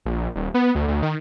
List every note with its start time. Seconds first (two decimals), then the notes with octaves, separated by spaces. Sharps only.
0.06 A#1
0.35 D#1
0.54 B3
0.75 D2
0.88 D2
1.03 D#3